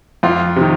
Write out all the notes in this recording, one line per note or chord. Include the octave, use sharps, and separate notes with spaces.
F2 F4
C3 D#3